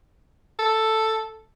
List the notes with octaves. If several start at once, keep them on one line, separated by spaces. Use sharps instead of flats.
A4